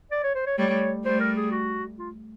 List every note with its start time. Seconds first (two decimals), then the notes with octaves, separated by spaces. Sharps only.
0.12 D5
0.24 C#5
0.35 C5
0.47 C#5
0.58 G3 A3 C#5
1.05 G3 A3 C5
1.20 A#4
1.36 G#4
1.51 F#4
1.99 F4